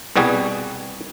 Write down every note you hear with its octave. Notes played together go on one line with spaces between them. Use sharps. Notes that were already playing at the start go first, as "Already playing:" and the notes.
C2 B2 G3 F#4 G#4